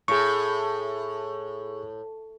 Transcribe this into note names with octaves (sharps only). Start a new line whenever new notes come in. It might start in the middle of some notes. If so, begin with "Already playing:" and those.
A2 G#4 C#6